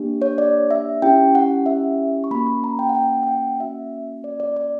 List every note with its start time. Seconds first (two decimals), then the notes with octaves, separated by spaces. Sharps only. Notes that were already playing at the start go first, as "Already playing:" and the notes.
Already playing: A#3 D4 G4
0.22 C#5
0.38 D5
0.71 E5
1.02 C#4 E4 G4 G5
1.35 F#5
1.66 E5
2.24 C#6
2.31 A#3 C#4 F#4 B5
2.47 B5
2.64 A#5
2.79 G5
2.89 F#5
2.95 G5
3.23 G5
3.27 F#5
3.60 A#3 C#4 F#4 E5
4.24 D5
4.40 D5
4.56 D5